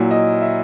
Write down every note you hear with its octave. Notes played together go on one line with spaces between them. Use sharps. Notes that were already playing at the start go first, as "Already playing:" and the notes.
Already playing: A#2 F#3 E4
D#5
E5